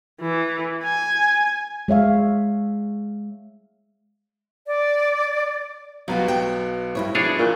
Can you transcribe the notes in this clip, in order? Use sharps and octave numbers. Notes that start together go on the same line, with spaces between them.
E3
G#5
G#3 C#5 E5 F5
D5
B1 F#3 G3 B3 F4 F#4
G5
G2 E4 C#5
B2 F3 D4 E4 G#4 C#5
A#2 C#6 F#6 G6